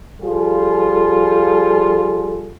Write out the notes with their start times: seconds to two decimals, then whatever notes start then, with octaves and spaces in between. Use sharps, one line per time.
0.21 F3 G3 F4 G#4 A4